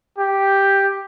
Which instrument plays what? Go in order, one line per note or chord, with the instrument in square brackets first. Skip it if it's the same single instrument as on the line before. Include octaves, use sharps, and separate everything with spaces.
[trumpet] G4